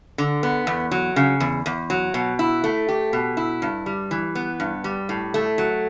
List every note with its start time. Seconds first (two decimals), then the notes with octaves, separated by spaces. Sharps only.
0.18 D3
0.43 B3
0.67 E2
0.91 F#3
1.16 C#3
1.40 E2
1.66 E2
1.90 F#3
2.14 B2
2.39 E4
2.64 A3
2.89 G4
3.13 B2
3.37 E4
3.62 G2
3.86 G3
4.11 E3
4.35 B3
4.60 G2
4.84 G3
5.09 A2
5.34 A3
5.58 F#3